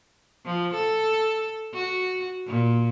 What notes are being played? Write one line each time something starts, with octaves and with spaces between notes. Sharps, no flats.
F3
A4
F#4
A#2